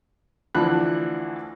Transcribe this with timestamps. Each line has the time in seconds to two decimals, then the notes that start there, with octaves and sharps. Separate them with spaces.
0.55 D2 E3 F3 D4 B5 F#6